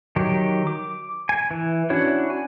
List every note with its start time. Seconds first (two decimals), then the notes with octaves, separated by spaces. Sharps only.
0.16 D#3 F#3 G4
0.67 D6
1.29 G#5
1.51 E3
1.90 C#4 D4 E4 F#4 C#5
2.30 G#5